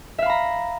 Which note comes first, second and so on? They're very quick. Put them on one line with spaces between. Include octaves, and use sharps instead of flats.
E5 F5 B5 A#5